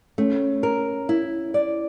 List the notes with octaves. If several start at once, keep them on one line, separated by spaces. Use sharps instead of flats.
A3 C#4
A#4
E4
D5